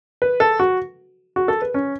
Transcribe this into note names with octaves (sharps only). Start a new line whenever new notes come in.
B4
A4
F#4
F#4
A4
B4
C#4